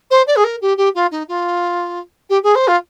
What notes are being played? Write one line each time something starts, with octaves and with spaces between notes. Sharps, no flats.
C5
D5
G#4
A#4
G4
G4
F4
D#4
F4
G4
G#4
C5
F4